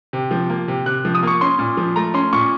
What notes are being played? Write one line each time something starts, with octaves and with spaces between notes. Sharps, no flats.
C3
F3
A#3
C3
C3 F#6
F3
D#6
A#3 C#6
C#4 C6
A#2
F3
A3 A#5
C#4 C6
A#2 C#6